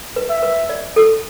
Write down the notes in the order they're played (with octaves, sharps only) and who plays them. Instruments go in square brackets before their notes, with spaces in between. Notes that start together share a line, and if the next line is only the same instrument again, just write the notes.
[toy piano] B4
[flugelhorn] E5
[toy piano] B4
D5
A4